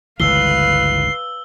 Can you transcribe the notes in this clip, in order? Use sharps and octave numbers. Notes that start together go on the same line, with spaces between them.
G1 C#2 E3 B4 F5 E6 C7 G7